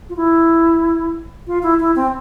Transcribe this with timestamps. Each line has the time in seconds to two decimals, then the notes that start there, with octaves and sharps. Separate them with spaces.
0.09 F4
0.16 E4
1.47 F4
1.63 E4
1.80 E4
1.96 C4